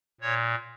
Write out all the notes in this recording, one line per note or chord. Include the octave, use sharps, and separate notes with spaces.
A#2 C#5